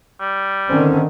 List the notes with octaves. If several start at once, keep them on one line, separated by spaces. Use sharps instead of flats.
G3
D3 D#3 C4 C#4